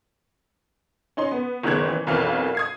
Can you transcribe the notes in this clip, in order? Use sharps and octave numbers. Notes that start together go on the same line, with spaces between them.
C#4 D#4 C6
B3
F#1 D#3 G#3 B3 F#6 G#6
E3
B1 F2 E3 A#4 F5 F6
D#6 G#6 C7